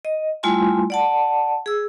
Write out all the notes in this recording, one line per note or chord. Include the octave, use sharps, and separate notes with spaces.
D#5
G3 A3 E4 F4 G#5 C6
D5 F#5 A5
G#4 E6